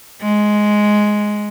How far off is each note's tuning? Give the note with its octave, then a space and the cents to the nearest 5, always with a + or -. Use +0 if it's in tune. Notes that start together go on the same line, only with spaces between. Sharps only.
G#3 +5